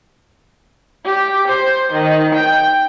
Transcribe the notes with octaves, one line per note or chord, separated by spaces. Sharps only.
G4
C5
D#3
G5